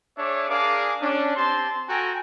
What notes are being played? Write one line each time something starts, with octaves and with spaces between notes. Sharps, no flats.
D4 G#4 C#5 E5 D6
D4 G#4 A#4 F5 D6
C#4 D4
C4 G4 A5 C6
F#4 A4 G5 G#5 A#5